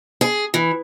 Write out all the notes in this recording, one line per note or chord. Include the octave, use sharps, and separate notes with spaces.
G#4
E3